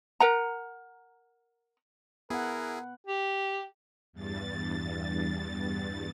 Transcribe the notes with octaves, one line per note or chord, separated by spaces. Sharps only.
A#4 F#5 A#5
B3 E4 G#4 A#4 F#5
G4
E2 G2 A6